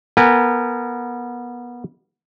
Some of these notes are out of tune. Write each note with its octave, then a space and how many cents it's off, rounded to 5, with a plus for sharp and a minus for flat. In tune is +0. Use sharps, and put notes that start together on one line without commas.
B3 -25 A#4 -30 G#5 -35